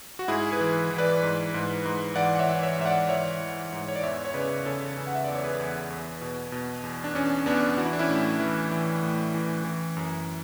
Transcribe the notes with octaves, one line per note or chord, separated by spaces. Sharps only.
F#4
G#2 E4 G#4
G#4 B4
E3
E3
B4 D5
G#2
G#2
G#2
E3 D5 F#5
F#5
C#5 E5
E3
C#5 E5
G#2 E5
D5 F#5
E3 C#5 E5
E3
G#2
C#5
D5
E2 C#5 E5
C#5
C#3 B4 D5
C#3 A4 C#5
C#3
F#5
E5
E2 D5
C#5
G#4 B4
E2
E2
B2
B2
E2
D4
E2 C#4
E2 B3 D4
E3 F#4
E4
D4
C#4 E4
A2
E3
E3
A2
E3
E3
F#2